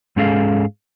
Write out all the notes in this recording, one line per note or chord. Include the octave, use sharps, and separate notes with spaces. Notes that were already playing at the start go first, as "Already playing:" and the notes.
G#2 G#3 C#4 G#4 A4 F5